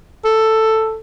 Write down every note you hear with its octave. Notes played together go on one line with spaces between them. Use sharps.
A4